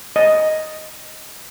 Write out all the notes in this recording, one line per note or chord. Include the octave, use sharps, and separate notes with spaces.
D#5